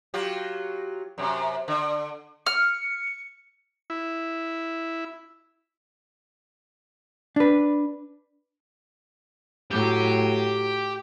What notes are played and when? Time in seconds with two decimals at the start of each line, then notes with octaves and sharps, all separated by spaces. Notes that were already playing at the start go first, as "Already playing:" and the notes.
0.14 F#3 F4 G4
1.18 F#2 C3
1.68 D3
2.47 F6 C#7
3.90 E4
7.36 D4 B4
9.71 A2 F#3 G4